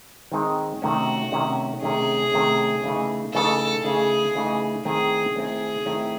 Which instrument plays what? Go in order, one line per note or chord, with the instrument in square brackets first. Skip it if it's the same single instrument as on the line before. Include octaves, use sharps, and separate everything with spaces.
[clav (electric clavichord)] D#3 G#3 C4 D#4
[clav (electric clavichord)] C3 D#3 A3 C#4 [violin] F#4
[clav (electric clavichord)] C3 D#3 A3 C#4
[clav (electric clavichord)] C3 D#3 A3 C#4 [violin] G#4
[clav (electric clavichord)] C3 D#3 A3 C#4
C#3 E3 A3 D#4
[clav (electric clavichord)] C#3 E3 A3 D#4 [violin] A4
[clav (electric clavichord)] C#3 E3 A3 D#4 [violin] G#4
[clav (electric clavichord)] C#3 E3 A3 D#4
[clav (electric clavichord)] D#3 A3 C4 E4 [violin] G#4
[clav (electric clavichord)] D#3 A3 C4 E4 [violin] G#4
[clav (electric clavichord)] D#3 A3 C4 E4